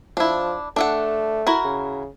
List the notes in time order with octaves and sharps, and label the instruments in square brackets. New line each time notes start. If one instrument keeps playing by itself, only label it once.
[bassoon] F3 [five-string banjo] D4 E4
[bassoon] A3 [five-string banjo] D4 A4 F#5
[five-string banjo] E4 F#4 A#4
[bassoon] C#3